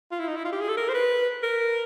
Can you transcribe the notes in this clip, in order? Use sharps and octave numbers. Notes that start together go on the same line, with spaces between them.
F4
E4
D#4
E4
F4
G4
G#4
A4
A#4
C5
B4
A#4